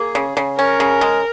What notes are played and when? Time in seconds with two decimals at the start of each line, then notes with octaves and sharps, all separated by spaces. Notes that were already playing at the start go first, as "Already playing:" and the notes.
Already playing: A#3 G#4
0.15 C#3
0.37 C#3
0.59 C#4 A#4
0.80 C#3
1.01 G#3